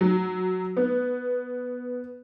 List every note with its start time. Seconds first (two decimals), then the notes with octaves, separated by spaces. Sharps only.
0.01 F#3
0.77 B3